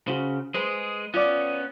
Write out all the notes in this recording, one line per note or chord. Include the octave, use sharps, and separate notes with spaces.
C#3 F#4 C5
G#3 G#4 B4 C5
B3 C#4 F4 D5